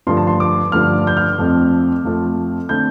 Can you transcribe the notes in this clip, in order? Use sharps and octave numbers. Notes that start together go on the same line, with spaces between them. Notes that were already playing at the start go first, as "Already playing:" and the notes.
G2 D3 F3 A3 C6
A5
C6
D6
G2 D3 F3 A3 F6
G6
F6
F2 F3 A3 C4
F2 F3 A3 C4
D3 A3 C4 G6